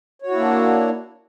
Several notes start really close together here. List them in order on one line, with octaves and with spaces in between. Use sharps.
C#5 F#4 E4 A#3 D4